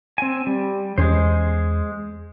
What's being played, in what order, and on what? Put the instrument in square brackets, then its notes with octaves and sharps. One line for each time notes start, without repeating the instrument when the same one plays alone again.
[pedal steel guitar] C4 G#5
G3
[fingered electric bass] E2 C#4 [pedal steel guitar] G#3 G#4 C5